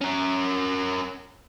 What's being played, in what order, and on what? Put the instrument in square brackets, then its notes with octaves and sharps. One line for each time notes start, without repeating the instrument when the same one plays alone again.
[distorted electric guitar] C#4 A#4